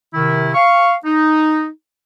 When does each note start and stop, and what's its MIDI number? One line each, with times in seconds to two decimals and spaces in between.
0.14 0.50 48
0.14 0.50 51
0.14 0.50 64
0.54 0.94 77
0.54 0.94 85
1.04 1.67 63